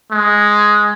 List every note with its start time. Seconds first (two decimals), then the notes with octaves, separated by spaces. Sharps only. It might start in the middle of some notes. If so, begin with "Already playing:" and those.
0.11 G#3